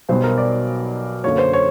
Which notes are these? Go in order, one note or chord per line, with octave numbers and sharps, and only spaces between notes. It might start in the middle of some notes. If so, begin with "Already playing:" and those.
B1 B2 G3 B3 C5
A#4
D5
F#2 D3 F#3 A#3 C#5
C5
C#5